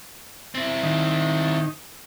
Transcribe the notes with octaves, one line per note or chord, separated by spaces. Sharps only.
C4 E4
D#3